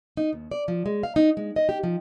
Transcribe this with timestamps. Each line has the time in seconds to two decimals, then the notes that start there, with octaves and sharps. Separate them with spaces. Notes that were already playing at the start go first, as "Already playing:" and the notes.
0.17 D#4
0.33 D#2
0.51 D5
0.68 F3
0.86 G#3
1.03 F5
1.16 D#4
1.37 G#3
1.56 D#5
1.69 G4
1.84 F3